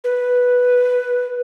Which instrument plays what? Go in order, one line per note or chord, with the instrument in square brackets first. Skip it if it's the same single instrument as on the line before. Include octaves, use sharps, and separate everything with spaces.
[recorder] B4